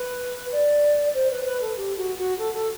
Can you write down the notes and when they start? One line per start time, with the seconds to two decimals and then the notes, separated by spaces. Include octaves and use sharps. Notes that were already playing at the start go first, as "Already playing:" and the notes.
Already playing: B4
0.52 D5
1.14 C5
1.31 B4
1.45 B4
1.61 A4
1.77 G4
1.97 F#4
2.18 F#4
2.39 A4
2.54 A4